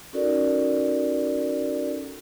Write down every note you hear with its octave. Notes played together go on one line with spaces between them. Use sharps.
C#4 D#4 F#4 A4 A#4 D5